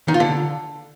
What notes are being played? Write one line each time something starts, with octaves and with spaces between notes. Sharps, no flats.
D#3
F4
D3